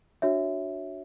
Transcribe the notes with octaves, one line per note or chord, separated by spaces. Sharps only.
D4 F#4 C#5 E5